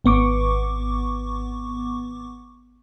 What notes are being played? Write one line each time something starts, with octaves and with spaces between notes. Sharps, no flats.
G#1 B3 C#6 D6